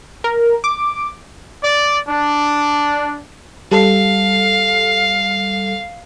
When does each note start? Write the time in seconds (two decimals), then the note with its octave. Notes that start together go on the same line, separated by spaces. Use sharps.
0.24 A#4
0.64 D6
1.63 D5
2.08 D4
3.71 G3 A4 F5 C7